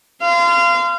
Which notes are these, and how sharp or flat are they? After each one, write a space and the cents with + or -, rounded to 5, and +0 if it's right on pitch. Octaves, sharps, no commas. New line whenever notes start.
F5 -25 C6 -35